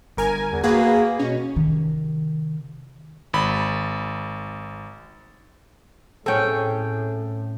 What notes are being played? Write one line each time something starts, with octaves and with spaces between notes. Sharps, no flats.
G1 A#4 G#5
E2
A#3 F#4 G#4 B4
B2 C#4
C3 D#3
G#1 B5
A2 C4 C#4 G#4 A4 G5